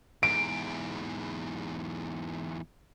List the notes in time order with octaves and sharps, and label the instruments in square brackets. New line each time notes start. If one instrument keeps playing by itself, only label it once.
[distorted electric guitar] E2 G#2 [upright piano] D7